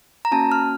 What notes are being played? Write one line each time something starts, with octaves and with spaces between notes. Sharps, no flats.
A#5
A#3 C#4 F#4 A5
F6